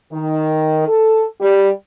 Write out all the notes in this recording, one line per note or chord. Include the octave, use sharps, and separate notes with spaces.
D#3
A4
G3